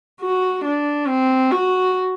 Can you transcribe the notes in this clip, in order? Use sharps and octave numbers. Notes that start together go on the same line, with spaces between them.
F#4
D4
C4
F#4